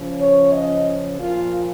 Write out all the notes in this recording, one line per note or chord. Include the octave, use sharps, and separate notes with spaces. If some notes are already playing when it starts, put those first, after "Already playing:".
Already playing: C#3 F3 C#4
C#5
D#5
A#2 F3 A#3 F4